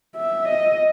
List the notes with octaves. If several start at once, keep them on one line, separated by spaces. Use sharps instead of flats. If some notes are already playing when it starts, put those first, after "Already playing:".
E5
D#5